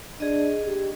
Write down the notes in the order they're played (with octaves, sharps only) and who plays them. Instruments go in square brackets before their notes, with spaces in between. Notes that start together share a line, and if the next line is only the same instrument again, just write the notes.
[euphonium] D4 [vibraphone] G#4 D#5
[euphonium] G4